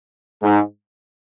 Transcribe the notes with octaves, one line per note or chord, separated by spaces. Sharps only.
G#2